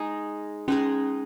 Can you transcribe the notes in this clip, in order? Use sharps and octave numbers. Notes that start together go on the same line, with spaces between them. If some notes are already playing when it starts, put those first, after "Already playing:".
Already playing: G#3 D#4 G#4
G#3 C#4 D#4 G#4